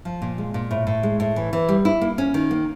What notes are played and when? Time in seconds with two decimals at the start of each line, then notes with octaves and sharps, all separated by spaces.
0.05 F3
0.22 A#2
0.38 G#3
0.54 A#2
0.71 A2
0.87 A2
1.03 G#3
1.20 A2
1.36 E3
1.53 E3
1.69 G3
1.85 E4
2.01 A#3
2.18 C#4
2.34 D#3
2.51 A#3